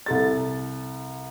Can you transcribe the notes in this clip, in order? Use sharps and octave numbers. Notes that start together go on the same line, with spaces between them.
C2 A4 A6